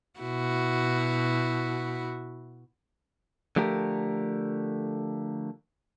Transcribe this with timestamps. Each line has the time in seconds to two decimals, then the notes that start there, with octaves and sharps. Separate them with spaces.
0.20 B2 E4 F#4
3.56 D3 F3 A3 G4 A#4